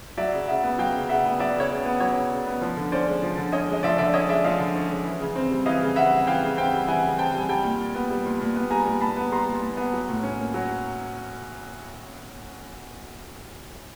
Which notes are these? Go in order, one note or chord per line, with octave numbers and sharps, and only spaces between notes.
F#3 D5 E5
C#3
C#3 E5 F#5
B3
F#3 F5 G5
C#3
C#3 E5 F#5
B3
F#3 D5 E5
C#3 C#5
C#3
B3
F#3 C#5
C#3
C#3
B3
F3
D3
C#4 C5 D5
G#3
F3
D3
C#4 C#5 D#5
G#3
D#5
F3 D5 E5
D3 D5 E5
C#4 C#5 D#5
G#3 D5 E5
F3 D#5 F5
D3
C#4
G#3
E3
C#3
C4
G3
E3 D#5 F5
C#3
C4 E5 F#5
G3
E3 F5 G5
C#3
C4 F5 G5
G3
E3 F#5 G#5
C#3
C4 G5 A5
G3 G#5
G3 G5 A5
A#2
A#2
B3
G3
A#2
A#2
B3
G3 G#5 A#5
A#2
A#2 A5 B5
B3
G3 A#5 C6
A#2
A#2
B3
F#3
A2
C#4
A#3
F#3